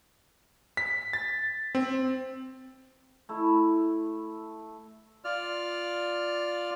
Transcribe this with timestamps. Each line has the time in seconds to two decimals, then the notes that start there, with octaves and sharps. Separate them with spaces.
0.77 B6
1.13 A6
1.75 C4
3.29 A3 E4
5.25 F4 D5 F6